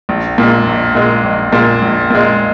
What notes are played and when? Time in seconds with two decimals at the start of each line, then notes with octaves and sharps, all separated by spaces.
0.09 A#1
0.38 A#2 G#3
0.67 A#1
0.95 A#2 G#3
1.24 A#1
1.53 A#2 G#3
1.82 A#1
2.10 A#2 G#3